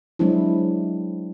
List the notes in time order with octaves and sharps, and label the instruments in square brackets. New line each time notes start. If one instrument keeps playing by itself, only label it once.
[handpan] F#3 G#3 C4 D4 E4